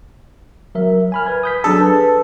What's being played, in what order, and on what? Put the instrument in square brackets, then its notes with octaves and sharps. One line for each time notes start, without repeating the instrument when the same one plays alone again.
[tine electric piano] F#3 A#4 E5
G#5 B5 F6
B4 G#6
D#6 G6 B6
[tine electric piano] F#3 D4 G#4 [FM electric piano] A4
[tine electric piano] B4